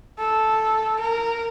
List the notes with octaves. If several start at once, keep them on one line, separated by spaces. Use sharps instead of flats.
A4
A#4